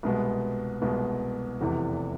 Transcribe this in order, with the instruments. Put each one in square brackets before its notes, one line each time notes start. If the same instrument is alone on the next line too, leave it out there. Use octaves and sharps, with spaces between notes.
[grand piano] C2 B2 G#3 B3
C2 B2 G#3 B3
F1 E2 C3 E3